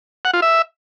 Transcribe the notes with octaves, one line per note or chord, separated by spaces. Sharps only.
F#5
F4
E5